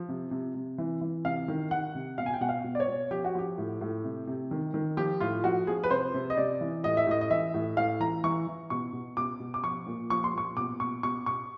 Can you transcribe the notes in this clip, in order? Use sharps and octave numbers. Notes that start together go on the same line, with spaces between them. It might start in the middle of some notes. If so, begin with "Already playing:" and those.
Already playing: F3
C3
C3
C3
E3
E3
C3 F5
D#3
D#3 F#5
C3
B2 F5
G#5
G5
B2 F#5
F5
B2
D5
C#5
B2
F3 G4
F#4
F3 G4
A2
A2
C3
C3
D#3
D#3
F3 G4
A2 F4
F3 F#4
F3 G#4
B4
C3 C5
C3
D#5
C3 D5
E3
A2 D#5
E5
A2 D#5
D#5
E3 E5
A2
A2 F5
E3 A#5
E3 C#6
E3
B2 C#6
B2
B2 D6
B2
D6
F3 C#6
A#2
F3 C#6
C6
A#2 C#6
B2 D6
B2 C#6
B2 C#6
B2 C#6